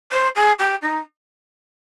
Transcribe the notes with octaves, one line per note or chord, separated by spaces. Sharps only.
C5
G#4
G4
D#4